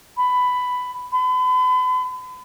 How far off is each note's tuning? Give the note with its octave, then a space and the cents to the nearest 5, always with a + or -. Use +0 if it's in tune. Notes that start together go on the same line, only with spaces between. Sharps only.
B5 +10
B5 +40